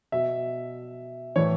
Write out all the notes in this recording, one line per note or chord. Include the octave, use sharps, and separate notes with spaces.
B2 E5
A2 E3 C#5